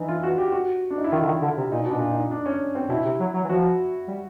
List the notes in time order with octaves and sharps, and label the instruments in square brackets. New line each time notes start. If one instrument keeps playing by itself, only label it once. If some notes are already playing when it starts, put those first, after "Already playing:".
Already playing: [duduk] E3 [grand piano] D4 D#4
[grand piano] F4
F#4
G4
F#4
D4
D#4
E4
[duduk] D#3 [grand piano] F4
[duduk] D3
D#3
D3
C3
[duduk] A#2 [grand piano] D#4
[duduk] B2
[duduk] A#2 [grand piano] D4
[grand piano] D#4
D4
C#4
C4
[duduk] B2 [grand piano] E4
[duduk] C3
F#3
F#3
E3
[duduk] F3 [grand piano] F#4
[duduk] G3